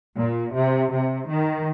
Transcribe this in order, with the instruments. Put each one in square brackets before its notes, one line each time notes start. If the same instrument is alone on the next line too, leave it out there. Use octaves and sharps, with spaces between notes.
[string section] A#2
C3
C3
D#3